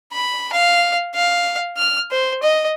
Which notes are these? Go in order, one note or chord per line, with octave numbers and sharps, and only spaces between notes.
B5
F5
F5
F6
C5
D#5